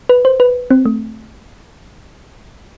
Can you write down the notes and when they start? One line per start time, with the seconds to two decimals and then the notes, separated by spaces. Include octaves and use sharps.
0.09 B4
0.25 C5
0.40 B4
0.71 C4
0.85 A3